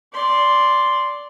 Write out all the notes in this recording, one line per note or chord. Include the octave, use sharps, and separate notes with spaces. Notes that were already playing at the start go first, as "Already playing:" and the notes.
D5 C6